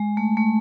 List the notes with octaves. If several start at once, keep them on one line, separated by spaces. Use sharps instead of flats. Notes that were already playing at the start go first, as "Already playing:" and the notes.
Already playing: G#3
A3
A3